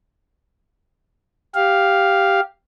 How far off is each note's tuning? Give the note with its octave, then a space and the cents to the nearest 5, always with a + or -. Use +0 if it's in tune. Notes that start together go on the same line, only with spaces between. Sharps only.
G4 +0 F5 +0